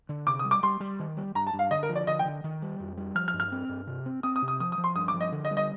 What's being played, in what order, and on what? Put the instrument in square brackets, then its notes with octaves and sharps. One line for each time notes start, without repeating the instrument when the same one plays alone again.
[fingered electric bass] D3
[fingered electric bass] C3 [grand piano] D6
[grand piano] D#6
[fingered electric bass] G3
[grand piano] D6
[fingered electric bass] G3 [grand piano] C6
[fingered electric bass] G3
D#3
G3
[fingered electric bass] G2 [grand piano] A#5
[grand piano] A5
[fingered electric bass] G2
[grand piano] F5
[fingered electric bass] D3 [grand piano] D#5
[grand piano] A#4
[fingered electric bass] F3
[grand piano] D5
[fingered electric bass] D3 [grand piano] D#5
[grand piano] G5
[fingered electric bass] D3
D#3
G3
F2
G3
[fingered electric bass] F3 [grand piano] F6
[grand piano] F6
[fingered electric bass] G2
[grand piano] F6
[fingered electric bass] C4
G2
C3
C4
[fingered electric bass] C4 [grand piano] D#6
[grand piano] D#6
[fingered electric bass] C3
[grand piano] D#6
[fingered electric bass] F3 [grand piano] D#6
[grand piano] D#6
[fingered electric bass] F3
[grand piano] C6
[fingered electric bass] G2 [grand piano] D#6
[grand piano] D6
[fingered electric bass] F3
[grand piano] D#5
[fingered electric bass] D3
[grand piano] D#5
[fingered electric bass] G3
[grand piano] D#5